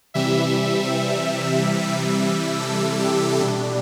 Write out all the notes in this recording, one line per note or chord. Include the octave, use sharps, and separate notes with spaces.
C3 E3 G3 E5
A4
G4
B2 G3 D4